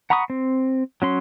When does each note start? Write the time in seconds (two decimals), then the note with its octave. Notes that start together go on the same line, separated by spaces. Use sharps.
0.10 F#5 A#5 B5 C#6 D#6
0.30 C4
1.02 F#3 C#4 C6